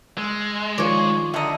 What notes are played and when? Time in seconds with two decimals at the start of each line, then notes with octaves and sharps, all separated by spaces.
0.18 G#3 E6
0.78 D#3 F3 F4 C#5 D5
1.34 D3 D#5 E5 A5 A#5